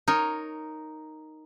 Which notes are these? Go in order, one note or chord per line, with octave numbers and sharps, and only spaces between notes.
D#4 A#4 C#5